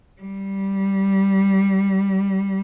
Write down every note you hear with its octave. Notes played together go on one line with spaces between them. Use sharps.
G3